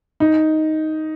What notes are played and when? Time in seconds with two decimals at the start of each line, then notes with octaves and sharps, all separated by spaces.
0.20 D#4